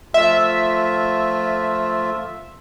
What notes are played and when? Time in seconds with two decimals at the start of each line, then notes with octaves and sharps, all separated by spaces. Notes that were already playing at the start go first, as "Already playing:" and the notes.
0.14 F3 A3 F4 E5